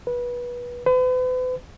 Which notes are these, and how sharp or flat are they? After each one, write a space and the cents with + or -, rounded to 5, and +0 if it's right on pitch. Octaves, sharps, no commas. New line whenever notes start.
B4 -20
B4 +45